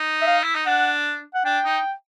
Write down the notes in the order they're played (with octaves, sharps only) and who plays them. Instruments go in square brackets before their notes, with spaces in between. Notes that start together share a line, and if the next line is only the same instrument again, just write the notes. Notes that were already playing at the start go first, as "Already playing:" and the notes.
Already playing: [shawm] D#4
[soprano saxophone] E5
F5
[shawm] E4
D#4
[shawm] D4 [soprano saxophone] F#5
[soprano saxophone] F#5
[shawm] D4 [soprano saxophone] G5
[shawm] D#4